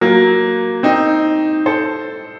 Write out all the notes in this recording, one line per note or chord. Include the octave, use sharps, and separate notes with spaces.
F#3 A#3
C4 D#4
A4 C5